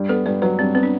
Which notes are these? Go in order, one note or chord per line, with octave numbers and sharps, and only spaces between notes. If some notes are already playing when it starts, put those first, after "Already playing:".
Already playing: G2
B3 A4
G2 B4
F#3 B4
G2 C4
B3 C4
D4